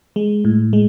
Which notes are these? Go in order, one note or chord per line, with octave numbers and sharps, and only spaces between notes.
G#3
A2
G#3